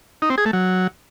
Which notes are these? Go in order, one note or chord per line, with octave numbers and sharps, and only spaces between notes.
D#4
C4
G#4
A3
F#3